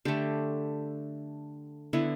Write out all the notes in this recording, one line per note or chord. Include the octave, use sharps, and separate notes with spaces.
D3 A3 G4
D3 B3 E4